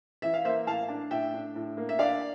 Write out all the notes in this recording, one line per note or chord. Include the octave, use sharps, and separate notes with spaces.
E3 E5
F5
A#3 C5 E5
A2 F5 A5
D4
A2 E5 G5
D4
A2
A#3
E5
D4 D5 F5